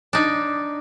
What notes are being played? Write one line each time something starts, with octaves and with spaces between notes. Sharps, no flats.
D4 D#4